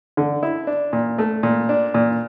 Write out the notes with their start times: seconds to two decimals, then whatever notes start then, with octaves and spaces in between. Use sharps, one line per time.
0.17 D3
0.43 E4
0.67 D4
0.93 A#2
1.18 A3
1.43 A#2
1.69 D4
1.94 A#2